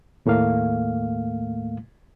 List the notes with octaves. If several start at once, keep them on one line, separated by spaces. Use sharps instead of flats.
D#2 A2 A3 A#3 F5